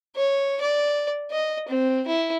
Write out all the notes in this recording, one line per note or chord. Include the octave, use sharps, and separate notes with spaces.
C#5
D5
D#5
C4
E4